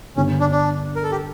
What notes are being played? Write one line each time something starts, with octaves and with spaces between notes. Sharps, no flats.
G1 G2 D3 C#4
D4
D4
A#4
A4
G4